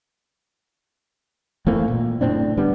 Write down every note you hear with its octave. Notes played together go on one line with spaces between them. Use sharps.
E3 A3 A#3 C4
A#2
F#1 A2 C4 D4
D3 G3 B3 D4